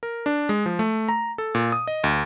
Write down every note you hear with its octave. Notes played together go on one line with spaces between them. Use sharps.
A#4
D4
G#3
F3
A3
A#5
A4
A#2
D#6
D#5
D2